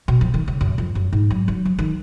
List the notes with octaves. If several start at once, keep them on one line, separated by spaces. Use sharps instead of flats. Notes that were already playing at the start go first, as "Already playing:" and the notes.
B2
F3
D#3
C#3
F#2
F2
F#2
G#2
F#3
F#3
F3
D#3